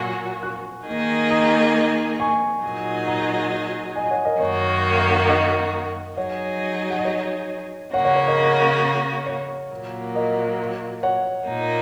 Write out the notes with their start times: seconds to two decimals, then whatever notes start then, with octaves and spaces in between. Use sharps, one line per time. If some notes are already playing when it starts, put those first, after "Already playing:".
Already playing: A#2 F#3 A#3 F#4 G#5
0.43 C#6 F#6
0.87 D#3 A#3 D#4 G#4
1.30 A#5 D#6
2.20 G#5 C#6
2.64 A#2 F#3 D#4 G#4
3.07 F#5 A#5
3.96 D#5 G#5
4.10 C#5 F#5
4.25 A#4 D#5
4.40 F#2 D#3 A#3 F#4 C#5
5.29 A#4 D#5
6.17 F#3 D#4 G#4 C#5 F#5
6.90 F#5
6.99 D#5
7.05 C#5
7.93 C#3 A#3 F#4 C#5 F#5
8.04 C#5 F#5
8.16 C#5
8.27 A#4 D#5
8.38 A#4
9.26 C#5
9.71 A#2 F#3 A#3
10.15 A#4 D#5
11.03 C#5 F#5
11.48 A#2 A#3 D#4